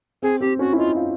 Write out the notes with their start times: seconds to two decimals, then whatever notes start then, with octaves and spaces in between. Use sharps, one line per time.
0.23 C4 G#4
0.41 C4 G4
0.59 C#4 F#4
0.73 E4
0.78 D#4 F4
0.96 F4